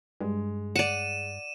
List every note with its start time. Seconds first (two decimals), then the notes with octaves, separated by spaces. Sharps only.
0.21 G2 G#3
0.76 D5 F#5 D#7 E7